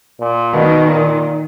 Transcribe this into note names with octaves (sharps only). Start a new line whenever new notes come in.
A#2
B2 D#3
A#2